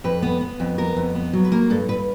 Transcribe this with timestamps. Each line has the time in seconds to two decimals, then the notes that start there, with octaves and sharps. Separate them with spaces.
0.04 F2 B4
0.22 B3
0.41 B3
0.60 F2
0.78 B3 A#4
0.97 F2
1.15 B3
1.33 F#3
1.44 B4
1.52 A#3 A#4
1.70 G2 A4
1.88 G2 B4